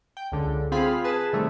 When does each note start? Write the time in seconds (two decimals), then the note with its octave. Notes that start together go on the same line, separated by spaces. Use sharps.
0.17 G5
0.32 C#2 D3
0.72 C4 F4 G#4 F5 B5
1.04 G#4 B4 A5
1.33 C3 D#3 G3 A3